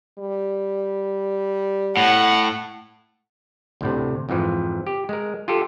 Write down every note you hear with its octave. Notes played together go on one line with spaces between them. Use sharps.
G3
A2 F#5
D2 A2 C3
F2 G#2 E3 F3
G4
G#3 A#4
F4 G4 A4